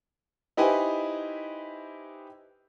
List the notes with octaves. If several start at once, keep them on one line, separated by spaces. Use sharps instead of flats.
D#4 E4 G4 B4 C5 G#5